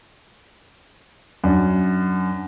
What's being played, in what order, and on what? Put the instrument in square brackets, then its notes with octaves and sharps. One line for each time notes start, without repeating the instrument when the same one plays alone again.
[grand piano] F#2 D4